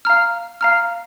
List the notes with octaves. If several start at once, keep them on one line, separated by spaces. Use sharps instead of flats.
F5 A#5 F6
F5 A#5 F6